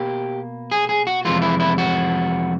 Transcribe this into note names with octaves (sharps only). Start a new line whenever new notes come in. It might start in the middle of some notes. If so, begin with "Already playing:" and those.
Already playing: B2 A#3 G4
G#4
G#4
F#4
F2 C3 E3 G#3 F4
E4
E4
F#4